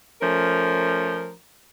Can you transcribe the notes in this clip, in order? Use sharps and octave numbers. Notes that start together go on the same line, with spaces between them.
F3 A3 C#4 A#4